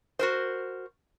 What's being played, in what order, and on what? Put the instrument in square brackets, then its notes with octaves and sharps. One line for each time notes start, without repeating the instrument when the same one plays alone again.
[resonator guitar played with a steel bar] F#4 A#4 C5